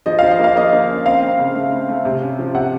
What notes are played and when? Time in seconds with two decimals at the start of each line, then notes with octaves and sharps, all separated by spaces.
0.06 F3 D#5
0.19 F3 F5
0.31 D#5
0.39 A#3 F5
0.56 A#3 D#5
0.73 A#3
0.89 C#4
1.06 C4 F5
1.23 C4
1.39 C#3
1.55 A3
1.72 C4
1.89 A3
2.05 C3
2.22 C#4
2.39 F3
2.55 C3 F#5